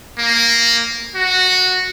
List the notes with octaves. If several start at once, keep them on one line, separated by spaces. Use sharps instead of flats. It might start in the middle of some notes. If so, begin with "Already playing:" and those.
A#3
F#4